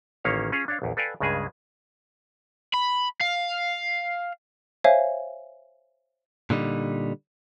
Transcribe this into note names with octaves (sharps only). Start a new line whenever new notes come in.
A1 D#3 A#3 C#4 C#5 F5
C#4 F4 G#4 C#5
D4 C#5 F5
A#1 E2
A4 B4 D5 F5 G5 G#5
C#2 G2 C#3 G#3 G#4 G#5
B5
F5
C5 C#5 E5 F5 G#5
A#2 D3 G3 D#4